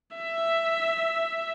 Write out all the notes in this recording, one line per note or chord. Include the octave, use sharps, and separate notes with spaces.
E5